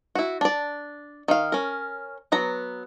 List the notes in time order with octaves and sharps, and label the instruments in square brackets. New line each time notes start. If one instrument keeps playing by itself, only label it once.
[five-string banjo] E4 F#4
D4 D5
D#3 F5
C#4 A#4
F#3 B3 A#5